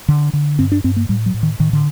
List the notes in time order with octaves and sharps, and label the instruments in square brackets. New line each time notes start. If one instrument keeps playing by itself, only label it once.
[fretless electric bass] D3
D3
G2 C4
D4
G2 C4
A#3
A2 G3
F#3
A2
D#3
A2 D#3
D3